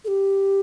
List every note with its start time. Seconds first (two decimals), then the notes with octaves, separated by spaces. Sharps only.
0.04 A4
0.08 G4